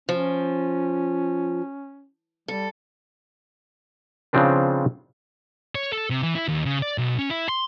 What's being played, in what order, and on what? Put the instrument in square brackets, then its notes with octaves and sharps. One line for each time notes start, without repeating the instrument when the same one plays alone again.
[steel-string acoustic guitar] F3 [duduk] C#4
[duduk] G3 [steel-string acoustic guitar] A4
[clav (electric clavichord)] C#3 F3 C4 D4 B4
[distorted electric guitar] C#5
A4
C3
E3
E4
D#2
C#3
D5
B1
C#4
E4
C6